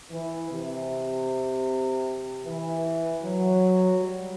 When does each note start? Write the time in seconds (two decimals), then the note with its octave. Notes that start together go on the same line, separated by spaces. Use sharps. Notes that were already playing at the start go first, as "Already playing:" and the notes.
0.11 E3
0.50 C3
2.45 E3
3.23 F#3
4.01 G3